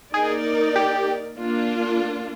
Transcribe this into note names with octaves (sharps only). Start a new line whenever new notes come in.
A#3 D#4 G#4 A#4 D5
G4
A#3 D4 F4